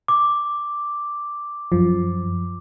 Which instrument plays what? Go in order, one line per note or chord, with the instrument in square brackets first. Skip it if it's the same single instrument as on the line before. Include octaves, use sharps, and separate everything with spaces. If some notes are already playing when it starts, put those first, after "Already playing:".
[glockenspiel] D6
[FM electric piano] F#2 F3